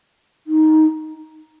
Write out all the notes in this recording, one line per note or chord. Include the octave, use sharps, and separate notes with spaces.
D#4